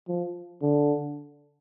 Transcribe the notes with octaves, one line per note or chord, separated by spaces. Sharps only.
F3
D3